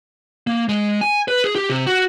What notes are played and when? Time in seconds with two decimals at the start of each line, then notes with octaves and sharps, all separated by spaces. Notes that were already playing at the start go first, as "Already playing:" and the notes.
0.47 A#3
0.69 G#3
1.01 G#5
1.28 B4
1.44 G#4
1.55 G4
1.69 C3
1.86 F#4